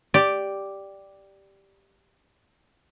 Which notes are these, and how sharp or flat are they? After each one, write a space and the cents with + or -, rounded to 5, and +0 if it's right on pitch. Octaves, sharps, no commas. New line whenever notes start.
G4 +0 D5 +0